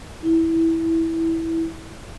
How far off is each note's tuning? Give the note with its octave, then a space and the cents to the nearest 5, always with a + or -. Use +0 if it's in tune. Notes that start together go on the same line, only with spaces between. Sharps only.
E4 -10